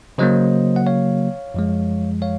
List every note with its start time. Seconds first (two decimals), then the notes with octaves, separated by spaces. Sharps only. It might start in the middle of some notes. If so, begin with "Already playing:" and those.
0.18 C#3 F#3 A#3 C5 D#5
0.76 F#5
0.87 C#5 F5
1.54 F#2 F3 G#3
2.22 C#5 F5